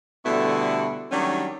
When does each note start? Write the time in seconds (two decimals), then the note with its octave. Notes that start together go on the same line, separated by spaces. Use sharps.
0.25 B2 D3 G3 A3 B3 E4
1.11 D#3 F#3 G3 A3 C#4 D4